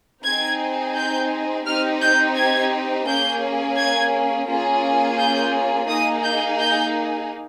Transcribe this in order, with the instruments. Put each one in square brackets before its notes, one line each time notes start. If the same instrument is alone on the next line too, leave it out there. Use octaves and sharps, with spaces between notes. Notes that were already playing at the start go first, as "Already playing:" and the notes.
[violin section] C4 D#4 G#4 G#6
G6
C4 D#4 G4 F6
G6
G#6
A#3 C#4 G#4 G6
G#6
A#3 C#4 F4 G#4
G6
A#3 D#4 G#4 D#6
G6
G6